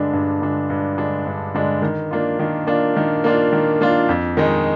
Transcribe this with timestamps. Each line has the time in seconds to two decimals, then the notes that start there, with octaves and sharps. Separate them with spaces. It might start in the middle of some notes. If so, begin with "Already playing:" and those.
Already playing: G2 D3 G#3 D4
0.13 G2
0.42 D3 G#3 D4
0.70 G2
0.98 D3 G#3 D4
1.27 G2
1.54 D3 G#3 D4
1.82 D#3
2.11 A#3 D4 F4
2.39 D#3
2.67 A#3 D4 F4
2.96 D#3
3.24 A#3 D4 F4
3.52 D#3
3.81 A#3 D4 F4
4.09 F2
4.37 D#3 G#3 D#4